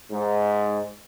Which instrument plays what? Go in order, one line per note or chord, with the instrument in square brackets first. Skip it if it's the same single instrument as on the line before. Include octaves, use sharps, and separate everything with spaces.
[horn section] G#2